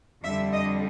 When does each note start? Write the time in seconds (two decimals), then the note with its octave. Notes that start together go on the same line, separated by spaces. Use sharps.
0.23 F2 D3 G3 E5
0.52 D#5